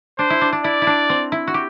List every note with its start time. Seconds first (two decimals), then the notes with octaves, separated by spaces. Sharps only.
0.19 D4 C5
0.30 E4
0.41 D4
0.52 D4
0.64 E4 D5
0.82 E4
0.87 D4
1.10 C4
1.32 E4
1.47 F#4
1.54 G4